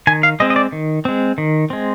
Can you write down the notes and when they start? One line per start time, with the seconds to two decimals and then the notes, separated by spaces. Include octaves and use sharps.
0.07 D#3 G#5
0.23 F5
0.40 G#3 C4 D#5
0.50 D#5
0.56 D5
0.72 D#3
1.05 G#3 C4
1.38 D#3
1.70 G#3 C4